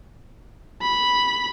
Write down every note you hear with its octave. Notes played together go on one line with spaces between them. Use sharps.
B5